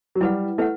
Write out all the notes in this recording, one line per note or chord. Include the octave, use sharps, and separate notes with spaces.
F#3
G3 E4 B4 F#5
A3 E4 B4 F#5